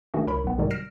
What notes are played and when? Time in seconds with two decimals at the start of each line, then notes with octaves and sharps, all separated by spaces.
0.14 D#3 A3 D4 F#4 G#4
0.27 C#2 A#4 C#5 B5
0.44 B1 B3
0.58 G#2 C3 D#3 F#3 G3
0.70 F6 A#6 C7 D7 E7